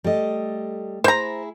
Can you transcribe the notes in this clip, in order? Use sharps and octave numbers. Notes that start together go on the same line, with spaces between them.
G3 A3 D#5
E4 G#4 C5 A#5